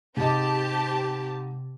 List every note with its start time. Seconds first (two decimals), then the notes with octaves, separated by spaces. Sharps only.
0.17 G#2 C3 C4 G4 D#5 A5